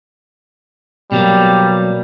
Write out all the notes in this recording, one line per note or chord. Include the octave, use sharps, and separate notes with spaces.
B2 F#3 G3 A#3